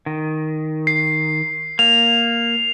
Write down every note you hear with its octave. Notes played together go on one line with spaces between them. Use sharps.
D#3
C7
A#3 F7